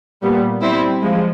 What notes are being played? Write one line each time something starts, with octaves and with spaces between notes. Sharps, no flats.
A#2 G3 B3
G3 C4 E4
F3 G#3